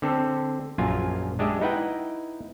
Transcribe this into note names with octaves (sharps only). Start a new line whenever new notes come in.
D3 C4 A4
A#1 F#2 F4 G#5
G#3 D4 G4 D#5 E5
D#4 E4 B4 F#5 G5